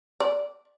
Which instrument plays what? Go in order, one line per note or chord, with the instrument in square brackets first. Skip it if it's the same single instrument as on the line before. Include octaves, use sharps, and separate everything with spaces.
[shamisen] D5